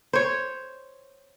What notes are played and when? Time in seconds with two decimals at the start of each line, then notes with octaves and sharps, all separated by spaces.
0.13 C5 C#5